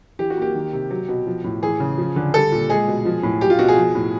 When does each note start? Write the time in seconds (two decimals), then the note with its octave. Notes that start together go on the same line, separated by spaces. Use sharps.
0.19 E3 G4
0.30 F#4
0.37 A#3 G4
0.55 D#3
0.73 C3
0.91 F#3
1.09 B2
1.27 F3
1.44 A2
1.62 E3 G#4
1.80 C#3
1.98 F3
2.16 D3
2.34 G3 A4
2.52 A#2
2.69 G#3 G#4
2.88 B2
3.05 F3
3.23 A2
3.41 F#3 G4
3.50 F4
3.59 B2 F#4
3.68 G#4
3.77 F3
3.95 A2